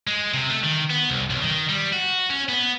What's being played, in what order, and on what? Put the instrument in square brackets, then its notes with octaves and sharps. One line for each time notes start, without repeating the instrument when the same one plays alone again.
[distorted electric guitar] G#3
C3
A3
D#3
B3
C2
B1
D#3
G3
F#4
C#4
B3